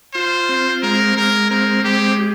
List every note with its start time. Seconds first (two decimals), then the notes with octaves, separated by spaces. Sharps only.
0.14 F4 C5
0.49 C4
0.83 G#3 A#4
1.16 G#3 A#4
1.50 C4 A#4
1.84 G#3 G4
2.19 G4